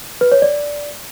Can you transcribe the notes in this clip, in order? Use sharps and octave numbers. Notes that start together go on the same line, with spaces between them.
B4
C#5
D5